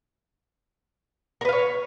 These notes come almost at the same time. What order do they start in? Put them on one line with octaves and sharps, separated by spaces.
A#4 B4 F5 C#5